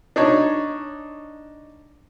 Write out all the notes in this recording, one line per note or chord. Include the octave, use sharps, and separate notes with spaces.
D4 D#4 C#5